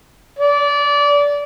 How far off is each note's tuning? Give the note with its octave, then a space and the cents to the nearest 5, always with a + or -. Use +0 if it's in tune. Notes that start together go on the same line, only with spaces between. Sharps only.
D5 -25